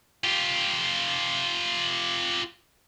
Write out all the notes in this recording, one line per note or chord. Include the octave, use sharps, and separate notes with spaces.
F4 G4